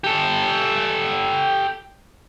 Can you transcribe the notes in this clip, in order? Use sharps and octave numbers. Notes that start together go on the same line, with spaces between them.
G4 A4